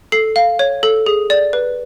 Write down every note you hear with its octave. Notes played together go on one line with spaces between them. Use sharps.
A4 C7
F5
C#5
A4
G#4
D5
B4